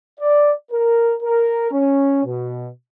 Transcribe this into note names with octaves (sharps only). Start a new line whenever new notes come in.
D5
A#4
A#4
C#4
B2